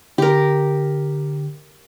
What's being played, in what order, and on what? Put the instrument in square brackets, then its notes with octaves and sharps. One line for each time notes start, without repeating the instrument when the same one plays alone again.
[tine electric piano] D3 [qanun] G4 A#4